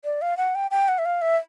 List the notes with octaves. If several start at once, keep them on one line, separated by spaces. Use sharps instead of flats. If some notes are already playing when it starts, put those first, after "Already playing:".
D5
F5
F#5
G5
G5
F#5
E5
F5
E5